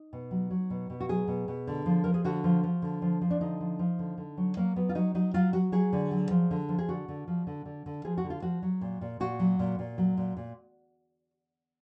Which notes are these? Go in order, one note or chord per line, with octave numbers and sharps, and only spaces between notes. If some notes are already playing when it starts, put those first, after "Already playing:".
Already playing: D#4
B2
F#3
F#3
B2
B2
F#4
F#3 G#4
B2
B2
D3
F3
F3 A#4
G#4
D3 F#4
F3
F3
D3
F3
F3
D4
D3 D#4
F3
F3
D3
D3
F#3
F#3 A#3
F#3 B3
F4
F#3 D#4
F#3 D#4
F#3 F4
F#3 F#4
F#3 G#4
D3
F#3
F3
D3
F3
G#4
D3 F#4
D3
F3
D3
D3
D3
F3 G#4
F#4
D3
F4
F3 F#4
F#3
A#2
A#2
A#2 F#4
F#3
A#2
A#2
F#3
A#2
A#2